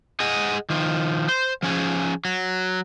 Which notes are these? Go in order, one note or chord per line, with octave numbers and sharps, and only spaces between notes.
G#4 D#5 F#5 G#5
D#3 F3
C5
F3 C#4 G#4
F#3